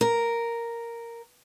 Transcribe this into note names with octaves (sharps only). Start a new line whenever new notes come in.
A#4